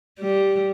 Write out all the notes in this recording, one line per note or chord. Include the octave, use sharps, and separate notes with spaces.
G3